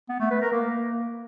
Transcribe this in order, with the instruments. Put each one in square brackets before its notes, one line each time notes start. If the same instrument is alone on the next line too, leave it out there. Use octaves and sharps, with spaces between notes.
[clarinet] B3
A3
B4
A#4
A#3